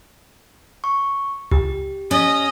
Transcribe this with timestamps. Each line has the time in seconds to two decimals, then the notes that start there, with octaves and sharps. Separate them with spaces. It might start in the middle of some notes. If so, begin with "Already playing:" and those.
0.84 C#6
1.51 C#2 G4
2.11 C#4 D#5